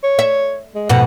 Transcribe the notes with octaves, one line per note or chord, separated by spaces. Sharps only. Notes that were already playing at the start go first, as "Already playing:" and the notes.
C#5
E5
G#3
F2 G#2 B2 F#5